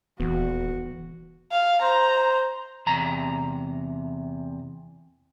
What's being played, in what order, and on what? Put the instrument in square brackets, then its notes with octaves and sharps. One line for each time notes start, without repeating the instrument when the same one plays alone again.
[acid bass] D#1 [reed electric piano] E2 E3 B3 [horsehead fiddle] F#4
[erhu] F5
[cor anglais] C5 [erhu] A#5
[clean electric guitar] E2 C3 A#5